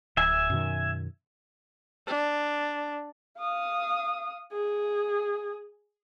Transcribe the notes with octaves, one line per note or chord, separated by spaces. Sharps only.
D1 E5 G#5
F#2 B2 D#3
D4
F5 D#6
G#4